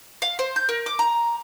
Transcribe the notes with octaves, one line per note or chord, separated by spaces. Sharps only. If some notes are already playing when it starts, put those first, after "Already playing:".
F5
C5
G6
A#4
D6
A#5